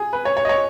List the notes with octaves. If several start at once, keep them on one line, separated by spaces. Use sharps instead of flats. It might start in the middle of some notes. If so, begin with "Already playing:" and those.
Already playing: G#4
B4
C#5
C#5
D#5
C#5